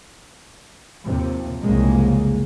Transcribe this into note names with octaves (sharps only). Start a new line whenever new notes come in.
D#2 C3 F3
C2 F2 C#3 G#3 A#3